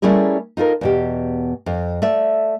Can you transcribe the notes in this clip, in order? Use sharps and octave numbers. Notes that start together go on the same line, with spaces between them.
G3 A3 C#4 E4 G#4 A#4
D#4 F4 A4 A#4
E2 B2 G4
F2
A3 D5 E5